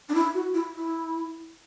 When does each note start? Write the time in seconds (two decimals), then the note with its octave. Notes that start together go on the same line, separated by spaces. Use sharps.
0.09 D4
0.15 E4
0.34 F#4
0.54 E4
0.75 E4